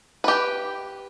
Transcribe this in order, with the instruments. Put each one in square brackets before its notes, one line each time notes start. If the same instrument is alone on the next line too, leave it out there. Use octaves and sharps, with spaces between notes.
[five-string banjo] G4 B4